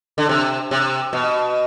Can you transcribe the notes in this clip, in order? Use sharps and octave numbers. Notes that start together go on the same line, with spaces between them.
D3
C3
C3
B2